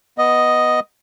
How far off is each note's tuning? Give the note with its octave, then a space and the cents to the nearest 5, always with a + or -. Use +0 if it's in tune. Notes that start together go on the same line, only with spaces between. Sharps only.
B3 +0 D#5 +0